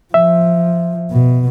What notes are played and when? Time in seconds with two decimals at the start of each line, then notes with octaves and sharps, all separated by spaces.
0.14 F3 E5
1.11 B2